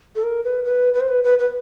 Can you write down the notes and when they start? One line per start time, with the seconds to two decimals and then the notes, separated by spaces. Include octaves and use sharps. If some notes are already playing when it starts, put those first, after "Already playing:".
0.15 A4
0.24 A#4
0.44 B4
0.64 B4
0.94 B4
1.01 C5
1.08 B4
1.24 B4
1.39 B4